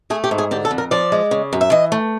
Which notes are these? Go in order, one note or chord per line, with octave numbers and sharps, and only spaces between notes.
A3 G#4
G4
G#2
G#4
D3 G4
A4
F2
A#4
F3 D5
G#3
C#3
F#2
E5
E3 D#5
A3